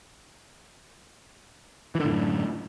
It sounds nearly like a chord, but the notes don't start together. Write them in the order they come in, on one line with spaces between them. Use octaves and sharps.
E3 D3 A2 F#2